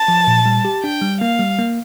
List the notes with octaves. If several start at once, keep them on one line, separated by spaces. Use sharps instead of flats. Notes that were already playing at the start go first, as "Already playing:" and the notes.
Already playing: A5
F3
A#2
G3
G4
D4 G5
G3
A#3 F5
G3
A#3